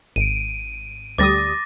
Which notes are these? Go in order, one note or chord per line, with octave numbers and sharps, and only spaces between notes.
G#1 D7 D#7
D2 G3 D6 D#6 A6 A#6